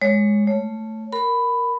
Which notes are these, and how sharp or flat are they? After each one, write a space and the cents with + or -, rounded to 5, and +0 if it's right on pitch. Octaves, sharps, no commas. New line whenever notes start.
G#3 +0 C#5 +0
A3 +0 C#5 +0
A#4 +0 B5 +10